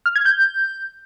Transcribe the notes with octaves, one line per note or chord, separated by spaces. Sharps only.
F6
G#6
G6